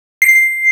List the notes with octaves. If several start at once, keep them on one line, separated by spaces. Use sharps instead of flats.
C7